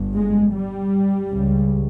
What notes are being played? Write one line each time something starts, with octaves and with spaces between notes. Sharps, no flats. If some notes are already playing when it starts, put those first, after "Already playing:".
Already playing: G1 G2
G#3
G3
C#2 C#3